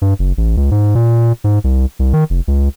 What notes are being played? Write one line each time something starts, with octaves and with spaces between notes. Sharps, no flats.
G2
F#1
A1
C#2
G#2
A#2
G#2
C2
C2
D#3
F1
C#2